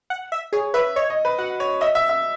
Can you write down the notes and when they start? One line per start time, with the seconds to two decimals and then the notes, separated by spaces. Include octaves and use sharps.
0.10 F#5
0.32 E5
0.53 G#4 C#5
0.74 B4 E5
0.96 C#5 D#5
1.10 D#5
1.25 B4
1.38 F#4 F#5
1.60 C#5
1.81 D#5 E5
1.95 E5
2.09 E5